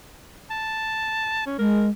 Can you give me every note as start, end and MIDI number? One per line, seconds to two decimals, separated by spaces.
0.51 1.44 81
1.47 1.59 61
1.59 1.90 56
1.59 1.86 70